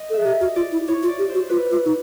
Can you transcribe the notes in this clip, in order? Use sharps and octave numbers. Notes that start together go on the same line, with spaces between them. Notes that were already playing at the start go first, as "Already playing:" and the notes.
Already playing: D#5
A4
G#4 E5
G4 D#5
F#4
F4 D5
E4
E4 C#5
F4
D5
G4
F#4 C5
F4 B4
F4
D#4